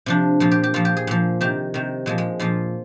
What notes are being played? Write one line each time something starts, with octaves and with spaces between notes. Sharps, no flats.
C3 F3 D4
A#2 F3 F4
G4
G4
A#2 F3 F4
G4
G#4
A#2 F3
C3 D#3 G4
C3 D#3
A#2 F3 G#3
G#3
A#2 F3 F4